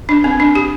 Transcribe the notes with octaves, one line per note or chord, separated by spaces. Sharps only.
D4
C4
D4
G4